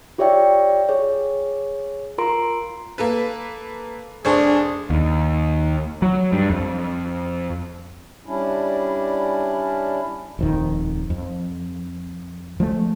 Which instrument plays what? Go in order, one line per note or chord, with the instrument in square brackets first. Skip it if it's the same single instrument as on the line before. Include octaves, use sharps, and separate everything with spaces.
[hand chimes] F4 G4 C#5 D5 E5 G5
G#4 C#5
F4 A#4 A#5 C6 D7
[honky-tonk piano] A#3 A4 B4
[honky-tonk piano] F1 C5 C#6 [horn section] D4 G#4
[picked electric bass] D#2
F#3
G2
F2
[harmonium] G3 C#4 D4 E4
[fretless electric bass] D#1 F2 D#3
F2
F3 G#3 A3